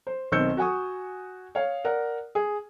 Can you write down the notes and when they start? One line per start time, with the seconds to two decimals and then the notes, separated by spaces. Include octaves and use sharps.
0.07 C5
0.32 B1 D#3 C4 E6 G6 C#7
0.57 F#4 F#5 G#5 C#6 D#6
1.55 C#5 F5
1.85 A#4 D5 F#5
2.35 G#4